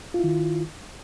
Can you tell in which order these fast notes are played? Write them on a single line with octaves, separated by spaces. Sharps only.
F4 E4 D#3